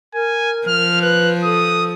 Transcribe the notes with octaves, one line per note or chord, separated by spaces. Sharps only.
A#4 G#5
F3 F6
B4 F#6
A4 D#6